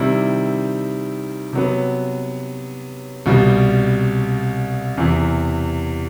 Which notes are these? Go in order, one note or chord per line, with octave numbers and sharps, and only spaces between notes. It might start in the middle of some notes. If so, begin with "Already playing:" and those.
Already playing: C3 D#3 G3 C4 E4
C3 F#3 B3
C2 B2 G3
E2 C3 E3